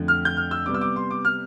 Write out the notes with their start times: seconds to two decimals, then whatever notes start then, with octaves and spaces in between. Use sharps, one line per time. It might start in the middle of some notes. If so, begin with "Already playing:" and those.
Already playing: F2 D3 A3
0.08 F6
0.25 G6
0.37 F6
0.51 E6
0.66 C3 G3 B3 D6
0.74 E6
0.81 D6
0.96 C6
1.11 D6
1.25 F6